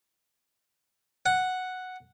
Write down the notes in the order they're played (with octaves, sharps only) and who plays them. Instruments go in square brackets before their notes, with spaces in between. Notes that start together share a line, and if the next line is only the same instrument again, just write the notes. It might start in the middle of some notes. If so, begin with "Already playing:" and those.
[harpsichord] F#5